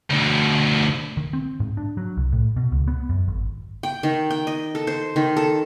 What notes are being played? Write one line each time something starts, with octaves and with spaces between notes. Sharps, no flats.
D2 B2
D#3
C4
G#2
D4
F#3
C2
A2
B2
C#2
B3
F#2
G#1
G5
D#3
G5
D#5
A4
C5
D#3
A4